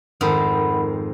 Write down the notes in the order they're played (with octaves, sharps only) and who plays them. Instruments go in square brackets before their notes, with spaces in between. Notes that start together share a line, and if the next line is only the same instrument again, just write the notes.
[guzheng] F2 G#2 D#3 [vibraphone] F#5 B5